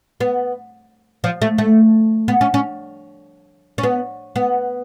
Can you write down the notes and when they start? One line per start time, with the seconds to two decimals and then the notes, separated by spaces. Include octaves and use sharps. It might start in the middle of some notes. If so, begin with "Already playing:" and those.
0.20 B3
1.24 F3
1.42 A3
1.58 A3
2.28 B3
2.41 C#4
2.54 C#4
3.78 C#4
3.83 B3
4.36 B3